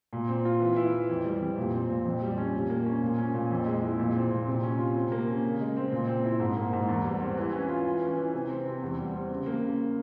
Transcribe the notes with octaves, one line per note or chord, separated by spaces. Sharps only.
A#2
C4
F4
E3
E4
E3
F2
G3
F2
A#2
C4
A#2
F2
G3
C#4
A#2
A#3
C#4
A#2
C#4
A#2
F2
G#3
E4
A#2
C4
A#2
C3
C#4
F4
C3
A#3
C#4
C#3
G#3
C4
A#2
C4
E4
G#2
A#3
G#2
E2
G3
C4
E3
C#4
F4
E3
C#4
E3
C3
C4
C3
E2
G3
C4
C#3
A#3
C#3